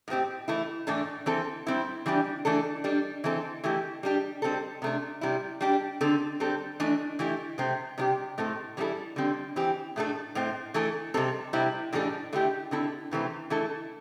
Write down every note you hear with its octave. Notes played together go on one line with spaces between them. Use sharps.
A2 A3 C4 G4
E3 A3 E4
A2 E3 A3 D4 A4
E3 C4 A4
G3 C4 E4
E3 G3 D4 G4
E3 A3 D4 A4
G3 D4 A4
E3 C4 A4
E3 A3 E4 G4
G3 D4 G4
G3 C4 A4
C3 A3 D4
C3 G3 E4
G3 D4 G4
D3 C4 A4
G3 C4 A4
E3 A3 D4
E3 A3 E4 G4
C3 A3 C4
C3 G3 D4 G4
A2 A3 C4 A4
E3 G3 C4 E4 A4
D3 G3 C4
E3 C4 G4
A2 A3 D4 A4
A2 A3 C4
E3 A3 E4 A4
C3 G3 C4 A4
C3 G3 C4 E4
A2 E3 G3 D4 A4
D3 A3 E4 G4
D3 C4 E4 A4
C3 E3 A3 C4
E3 A3 E4 A4